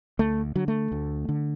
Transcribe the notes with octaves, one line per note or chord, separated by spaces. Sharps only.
D2 A3
D3 F#3
A3
D2
D3